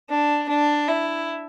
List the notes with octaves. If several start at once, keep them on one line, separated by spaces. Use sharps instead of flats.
D4
D4
E4